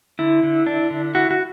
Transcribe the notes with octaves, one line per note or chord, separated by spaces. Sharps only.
D3 E4
D3
D4
D3
E4 F#4
F#4